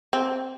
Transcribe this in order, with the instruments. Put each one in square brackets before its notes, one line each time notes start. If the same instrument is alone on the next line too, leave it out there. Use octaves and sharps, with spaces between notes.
[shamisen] C4